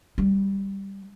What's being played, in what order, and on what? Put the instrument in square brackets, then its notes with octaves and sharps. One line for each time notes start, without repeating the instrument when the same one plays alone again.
[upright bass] G3